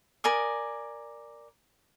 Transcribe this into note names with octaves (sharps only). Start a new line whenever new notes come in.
A#4 D5 G#5 D#6